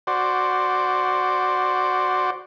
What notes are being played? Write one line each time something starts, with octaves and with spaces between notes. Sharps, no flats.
F#4 C5 D5